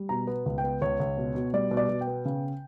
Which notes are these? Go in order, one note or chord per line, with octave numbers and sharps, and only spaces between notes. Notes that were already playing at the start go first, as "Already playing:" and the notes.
Already playing: G3
B2 A#5
B3
C#2
G5
B3
C#2 C#5
C#2
B2
B2
G3 D5
B2
D5
B2
G5
B3
C#3